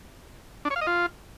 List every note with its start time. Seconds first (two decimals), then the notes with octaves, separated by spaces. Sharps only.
0.65 D4
0.70 C#5
0.76 F5
0.81 D#5
0.87 F4